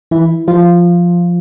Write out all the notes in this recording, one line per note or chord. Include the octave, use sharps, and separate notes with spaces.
E3 E4
F3 F4